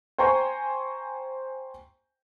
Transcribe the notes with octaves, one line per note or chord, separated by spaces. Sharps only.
C5 G5 G#5 A#5 C#6